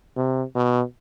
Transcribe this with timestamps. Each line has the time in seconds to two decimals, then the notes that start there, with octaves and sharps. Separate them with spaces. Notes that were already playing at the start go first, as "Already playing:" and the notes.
0.16 C3
0.55 B2